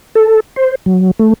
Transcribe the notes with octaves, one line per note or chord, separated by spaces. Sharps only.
A4
C5
F#3
A3